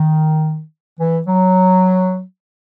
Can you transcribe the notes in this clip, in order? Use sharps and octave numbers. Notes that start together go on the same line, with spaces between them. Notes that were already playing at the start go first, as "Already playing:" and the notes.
Already playing: D#3
E3
F#3